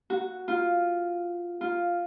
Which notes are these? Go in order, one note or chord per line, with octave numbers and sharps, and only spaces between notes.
F#4
F4
F4